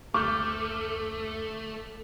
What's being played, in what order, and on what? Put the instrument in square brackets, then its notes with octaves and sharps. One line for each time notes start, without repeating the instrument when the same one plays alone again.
[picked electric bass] F#1 D2 [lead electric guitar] A3 [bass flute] A4 [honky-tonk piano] D6 F6 G6